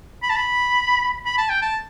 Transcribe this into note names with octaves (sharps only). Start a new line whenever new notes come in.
B5
A5
B5
B5
A5
G5
A5